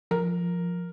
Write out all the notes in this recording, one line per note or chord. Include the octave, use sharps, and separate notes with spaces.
F3 A#4